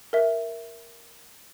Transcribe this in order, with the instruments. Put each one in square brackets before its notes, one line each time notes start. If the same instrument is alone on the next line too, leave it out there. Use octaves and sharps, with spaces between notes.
[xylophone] A#4 E5